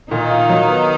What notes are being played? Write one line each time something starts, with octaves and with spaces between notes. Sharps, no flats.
A#2 D#3 D#4
F4
F#3
B3